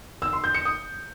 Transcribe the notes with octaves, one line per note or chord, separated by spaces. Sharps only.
E6
C6
G6
C#7
D#6